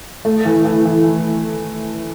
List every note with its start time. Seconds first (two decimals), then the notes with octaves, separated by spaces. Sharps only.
0.25 A3
0.45 E3
0.65 E3
0.85 E3